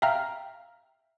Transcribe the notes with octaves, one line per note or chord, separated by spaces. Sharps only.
E5 F5 G5 A#5 F6